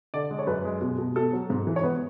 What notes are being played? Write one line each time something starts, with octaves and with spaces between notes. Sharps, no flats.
D3 D5
G#3
C#5
F#2 B4
G#3
B2
B2
B2 A4
F#3
G#2
E3
C#5
B3 B4